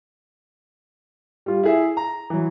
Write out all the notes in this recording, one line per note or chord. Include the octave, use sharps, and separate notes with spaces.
G3 F4
E4 G#4 E5
A#5
E3 F#3